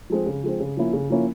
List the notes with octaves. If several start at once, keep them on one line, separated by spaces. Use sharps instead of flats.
F3 G#3 C4
C#3
F3 G#3 C4
C#3
F3 A#3 C#4 E4
C#3
F3 A#3 C#4 E4